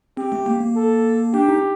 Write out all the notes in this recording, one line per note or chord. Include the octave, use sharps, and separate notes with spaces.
C4 G4
A3
A#3
A#3
A4
D4 G4
D#4